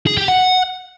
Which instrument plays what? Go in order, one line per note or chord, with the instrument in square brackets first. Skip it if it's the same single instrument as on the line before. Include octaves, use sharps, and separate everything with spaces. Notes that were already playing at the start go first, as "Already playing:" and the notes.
[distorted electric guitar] G#4
G4
F#5